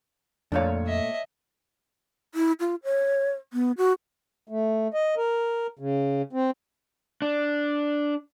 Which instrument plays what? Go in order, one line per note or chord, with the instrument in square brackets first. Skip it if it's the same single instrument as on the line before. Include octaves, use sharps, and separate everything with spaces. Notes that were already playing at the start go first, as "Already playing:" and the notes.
[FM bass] F2 [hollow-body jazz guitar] A#2 A3 F5 [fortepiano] D4 C#5
[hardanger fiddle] D#5 E5
[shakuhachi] E4
F4
C#5
B3
F#4
[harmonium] A3
D#5
A#4
C#3
C4
[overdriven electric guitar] D4